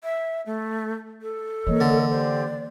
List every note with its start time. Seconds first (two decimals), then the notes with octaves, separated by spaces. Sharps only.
0.03 E5
0.46 A3
1.22 A4
1.67 E3 A#3 A#4 C#5 D#5
1.81 D3
2.11 G4 C5 D5